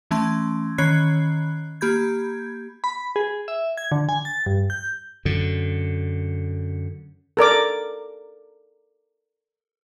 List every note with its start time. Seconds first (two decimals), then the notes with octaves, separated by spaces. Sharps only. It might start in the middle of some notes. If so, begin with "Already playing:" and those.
0.11 E3 A3 C#4 A5 C6 G#6
0.78 D#3 C#4 C#5 B5 F#6 C7
1.81 A#3 G4 B5 G6 G#6
2.84 B5
3.16 G#4
3.48 E5
3.77 G#6
3.92 D3
4.09 G#5
4.25 A6
4.46 G2
4.70 G6
5.25 F#2 D3
7.37 A4 A#4 D5 D6